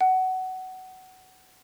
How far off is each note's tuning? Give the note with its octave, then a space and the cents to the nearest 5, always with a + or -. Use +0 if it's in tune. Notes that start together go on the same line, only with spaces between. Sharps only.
F#5 +20